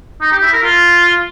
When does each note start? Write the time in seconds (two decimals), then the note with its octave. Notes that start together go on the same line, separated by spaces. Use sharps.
0.21 D#4
0.32 G4
0.42 E4
0.53 A#4
0.64 F4